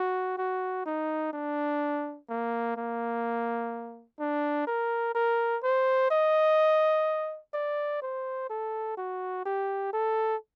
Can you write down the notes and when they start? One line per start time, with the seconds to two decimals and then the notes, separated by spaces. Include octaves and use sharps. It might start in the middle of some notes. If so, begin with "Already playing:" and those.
Already playing: F#4
0.38 F#4
0.86 D#4
1.33 D4
2.29 A#3
2.77 A#3
4.19 D4
4.67 A#4
5.15 A#4
5.63 C5
6.11 D#5
7.54 D5
8.02 C5
8.50 A4
8.97 F#4
9.45 G4
9.93 A4